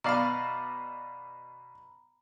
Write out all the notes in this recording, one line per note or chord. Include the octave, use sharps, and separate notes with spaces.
B2 D5 F5 A#5 B5